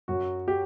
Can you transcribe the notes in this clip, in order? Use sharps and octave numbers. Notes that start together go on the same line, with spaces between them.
F#2 F#3 F#4
G4